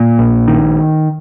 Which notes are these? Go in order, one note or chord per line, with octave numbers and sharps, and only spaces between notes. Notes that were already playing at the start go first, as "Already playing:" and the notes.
Already playing: A#2
A#1
D#3